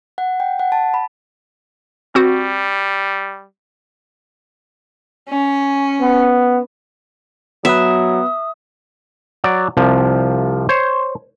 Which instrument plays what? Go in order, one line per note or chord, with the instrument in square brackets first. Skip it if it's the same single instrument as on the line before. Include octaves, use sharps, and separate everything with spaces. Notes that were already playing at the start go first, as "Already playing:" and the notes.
[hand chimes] F#5
G5
F#5
A5
B5
[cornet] G3 [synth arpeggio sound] C4 F#4
[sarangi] C#4
[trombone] B3
[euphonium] F#3 [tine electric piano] B3 B4 [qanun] E5 [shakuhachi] D#6
[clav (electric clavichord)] F#3 D5
C2 C3 F3
C5 C#5